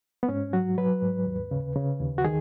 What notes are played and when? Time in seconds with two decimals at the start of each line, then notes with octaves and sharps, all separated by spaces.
0.23 B3
0.28 G#2 C#4
0.53 F#3 F#4
0.78 F#3 B4
1.02 G#2
1.27 D#2
1.51 C#3
1.76 C#3
2.00 D#2
2.18 F#4
2.24 D#3 G#4